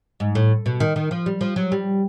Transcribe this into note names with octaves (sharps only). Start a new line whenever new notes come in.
G#2
A2
B2
D#3
D#3
F3
G3
F3
F#3
G3